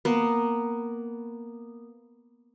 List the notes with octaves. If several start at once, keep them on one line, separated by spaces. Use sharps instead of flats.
A#3 B3